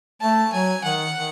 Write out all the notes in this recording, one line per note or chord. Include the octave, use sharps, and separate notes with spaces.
A3 A5
F#3 G#5
D#3 F#5
D#3